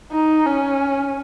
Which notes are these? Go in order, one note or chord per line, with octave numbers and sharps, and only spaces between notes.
D#4
C#4